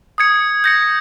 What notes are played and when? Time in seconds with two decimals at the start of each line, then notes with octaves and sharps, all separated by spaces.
0.18 D#6 G#6 C#7
0.64 G6 A#6 C#7